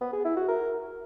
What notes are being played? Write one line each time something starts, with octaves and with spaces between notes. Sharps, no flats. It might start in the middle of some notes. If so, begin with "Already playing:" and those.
B3
G#4
E4
F#4
A#4